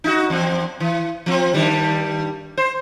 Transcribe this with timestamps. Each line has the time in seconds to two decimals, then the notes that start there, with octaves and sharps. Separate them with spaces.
0.04 D#4 E4 F#4
0.30 E2 C4
0.80 E3
1.26 F3 C4
1.54 G2 D#3 G3
2.57 C5